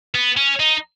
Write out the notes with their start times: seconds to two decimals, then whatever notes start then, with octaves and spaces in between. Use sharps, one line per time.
0.14 B3
0.37 C#4
0.60 D#4